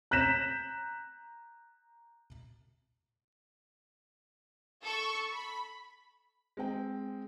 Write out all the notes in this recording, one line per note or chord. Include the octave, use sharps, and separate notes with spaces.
A#5 F#6 G6 A#6 B6 E7
A4 C#6
B5
G#3 C4 G5